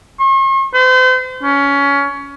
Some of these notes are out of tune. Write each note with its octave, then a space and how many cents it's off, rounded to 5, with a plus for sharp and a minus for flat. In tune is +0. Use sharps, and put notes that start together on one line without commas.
C#6 -45
C5 -40
C#4 +20